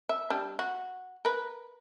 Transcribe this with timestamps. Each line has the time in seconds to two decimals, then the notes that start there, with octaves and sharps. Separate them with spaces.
0.09 E5
0.30 G3 D4
0.59 F#4
1.25 A#4 B4